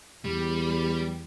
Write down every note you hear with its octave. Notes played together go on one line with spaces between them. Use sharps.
E2 G3